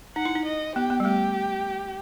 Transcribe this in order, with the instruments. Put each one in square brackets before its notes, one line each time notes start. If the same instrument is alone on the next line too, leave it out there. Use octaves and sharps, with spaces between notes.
[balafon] D#4 [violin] F#5
[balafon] E4
D#4
[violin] D#5
[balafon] B3 [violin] G4
[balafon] B3
G3
[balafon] A3 [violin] G4